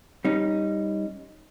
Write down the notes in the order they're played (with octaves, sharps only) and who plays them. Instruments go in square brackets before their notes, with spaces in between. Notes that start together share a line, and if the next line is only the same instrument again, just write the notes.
[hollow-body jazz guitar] G3 C#4 D#4